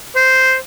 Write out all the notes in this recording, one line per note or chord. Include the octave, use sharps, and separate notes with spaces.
C5